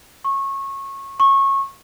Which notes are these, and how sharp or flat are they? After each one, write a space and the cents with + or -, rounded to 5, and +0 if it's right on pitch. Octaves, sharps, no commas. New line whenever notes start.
C#6 -20
C#6 -20